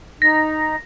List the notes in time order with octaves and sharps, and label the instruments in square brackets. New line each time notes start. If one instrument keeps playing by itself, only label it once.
[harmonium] D#4 [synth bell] A#6